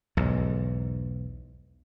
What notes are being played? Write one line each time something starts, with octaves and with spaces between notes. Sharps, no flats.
B1 E2 G#2